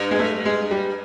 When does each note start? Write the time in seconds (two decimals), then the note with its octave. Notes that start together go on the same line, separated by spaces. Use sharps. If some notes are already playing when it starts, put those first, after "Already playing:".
Already playing: G2
0.11 G#3
0.19 A3
0.46 G#3
0.71 G3